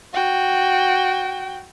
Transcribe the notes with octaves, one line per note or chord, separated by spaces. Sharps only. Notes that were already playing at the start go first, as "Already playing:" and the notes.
F#4 G5